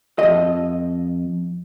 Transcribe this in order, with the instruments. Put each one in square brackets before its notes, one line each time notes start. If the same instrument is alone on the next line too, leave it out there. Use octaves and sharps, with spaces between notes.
[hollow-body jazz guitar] F2 D#5